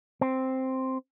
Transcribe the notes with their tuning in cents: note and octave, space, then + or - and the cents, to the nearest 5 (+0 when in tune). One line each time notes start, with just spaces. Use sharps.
C4 +0